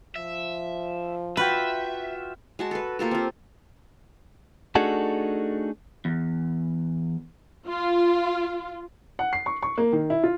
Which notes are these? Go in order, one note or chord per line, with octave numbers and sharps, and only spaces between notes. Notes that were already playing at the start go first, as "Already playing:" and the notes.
F3 E5
F4 F#4 B4 E5 G5
G#3 F#4 A5
A4 B4
A#3 F4 G4 A4
C4 F4
A3 D4 D#4 F#4 G#4 A4
E2
F4
F#5
C7
C#6
C#6
A#3
D#3
E4
F4